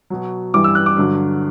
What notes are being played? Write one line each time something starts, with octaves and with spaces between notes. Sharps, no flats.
B2 F#3
G2 E3 G3 D6
E6
F#6
D6
G2 D3 F#3